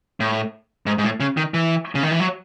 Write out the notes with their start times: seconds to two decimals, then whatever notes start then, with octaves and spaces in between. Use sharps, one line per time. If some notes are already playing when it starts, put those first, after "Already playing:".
0.20 A2
0.86 G#2
0.98 G#2
1.04 A2
1.20 C#3
1.37 D#3
1.54 E3
1.95 C#3
2.03 D#3
2.11 E3
2.20 F#3